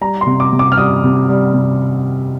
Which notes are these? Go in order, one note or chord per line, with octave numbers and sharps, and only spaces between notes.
G3 A#5
C6
C3
D6
C3
D6
F6
G3 D#6
C3
G3
C3